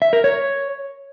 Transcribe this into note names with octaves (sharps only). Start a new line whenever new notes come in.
E5
A#4
C#5